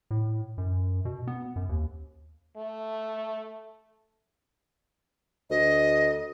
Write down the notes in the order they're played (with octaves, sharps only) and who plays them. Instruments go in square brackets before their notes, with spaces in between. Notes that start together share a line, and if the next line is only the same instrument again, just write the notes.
[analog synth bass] A2
F#2
B2
B3
F#2
D#2
[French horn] A3
[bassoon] D2 [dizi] D#5